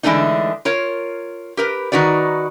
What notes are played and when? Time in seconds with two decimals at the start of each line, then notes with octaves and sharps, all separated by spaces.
0.03 D3 E3 G#3 A3 D4 D#4
0.65 F4 A#4 C#5
1.57 G4 A#4 B4
1.92 D#3 D#4 F#4 B4 D5